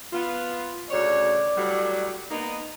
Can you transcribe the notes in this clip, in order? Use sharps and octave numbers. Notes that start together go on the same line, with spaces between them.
B3 F4
D2 C#3 C#5 D5
A2 F#3 G3
A#3 B3 D#4